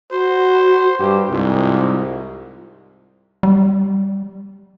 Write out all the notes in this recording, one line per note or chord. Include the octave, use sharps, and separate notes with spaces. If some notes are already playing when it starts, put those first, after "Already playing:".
F#4 C5
G2 G4
C2 G#2 F4
G3